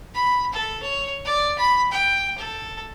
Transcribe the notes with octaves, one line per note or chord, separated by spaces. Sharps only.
B5
A4
C#5
D5
B5
G5
A4